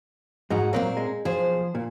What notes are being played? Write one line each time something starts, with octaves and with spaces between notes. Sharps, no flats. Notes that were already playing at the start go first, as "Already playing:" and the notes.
G#2 G#3 D#4 F#4 F#5 A#5
A#2 F#3 A#3 C4 A#4
G#3
B1 F3 G#4 C5
A#2